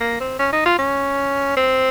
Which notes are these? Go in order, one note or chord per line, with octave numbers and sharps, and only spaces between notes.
A#3
C4
C#4
D#4
F4
C#4
C4